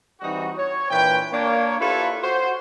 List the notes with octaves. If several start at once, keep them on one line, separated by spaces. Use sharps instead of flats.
E3 G3 C4 D#4 F#4
C#5
A#2 E3 D4 B4 G5
A#3 D4 C#5
E4 F4 G4 A4 B4 C#5
F#4 C5